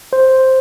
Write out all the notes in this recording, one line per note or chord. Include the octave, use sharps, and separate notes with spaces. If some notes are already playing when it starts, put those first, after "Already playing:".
C5